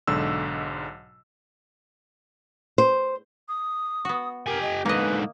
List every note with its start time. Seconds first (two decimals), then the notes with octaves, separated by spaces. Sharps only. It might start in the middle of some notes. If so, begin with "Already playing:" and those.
0.07 B1 G#2 D3 E6
2.78 C5
3.49 D#6
4.05 B3 F#4
4.46 G4 A#4 G#5
4.62 D#5
4.85 G#2 D3 A#3 B4 D#5